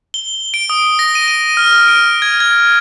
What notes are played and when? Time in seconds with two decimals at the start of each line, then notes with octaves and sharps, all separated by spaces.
0.14 G7
0.54 D7
0.70 D#6
0.99 A#6
1.15 D#7
1.28 D#7
1.57 F6
1.88 D7
2.22 G#6
2.40 G#6